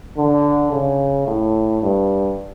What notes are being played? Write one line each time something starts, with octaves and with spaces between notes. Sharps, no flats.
D3
C#3
A2
G2